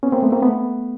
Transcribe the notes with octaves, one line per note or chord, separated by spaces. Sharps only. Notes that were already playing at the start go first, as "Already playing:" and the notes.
B3 C#4
A#3 C4
A3 B3
A#3 C4
A3 B3